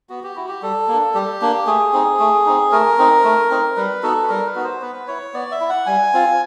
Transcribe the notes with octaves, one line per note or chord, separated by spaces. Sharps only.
B3 F#4
G4
E4 F#4
G4
G3 A4
A#3
D4
G3 G4
A#3 D4
A3 G#4
C4 D#4
A3
C4 D#4
A3 A#4
C4 D#4
A3
C4 D#4
G3 B4
B3 D#4 F#4 A4
B4
G3 A#4
B4
B3 D#4 F#4
C5
B3 B4
E4 C#5
B3 D5
E5
E4
F#5
G3 G#5
C4 F4